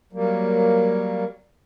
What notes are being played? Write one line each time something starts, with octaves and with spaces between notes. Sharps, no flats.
F#3 G3 A#3